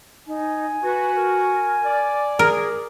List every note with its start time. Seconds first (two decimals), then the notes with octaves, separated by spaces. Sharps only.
0.27 D#4 G#5
0.83 F#4 B4
1.15 A#4
1.86 D5
2.39 G#4 A#4